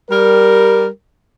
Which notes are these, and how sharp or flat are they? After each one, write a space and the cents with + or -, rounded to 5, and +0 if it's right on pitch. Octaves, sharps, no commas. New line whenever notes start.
G3 +0 A#4 +0